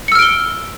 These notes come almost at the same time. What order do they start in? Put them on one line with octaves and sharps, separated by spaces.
C#7 E6 F6 D7 G7